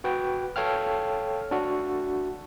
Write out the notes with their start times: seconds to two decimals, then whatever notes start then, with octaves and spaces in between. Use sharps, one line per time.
0.04 F#4 B4 G5
0.56 A4 C#5 F5 G5 F6
1.51 D4 F#4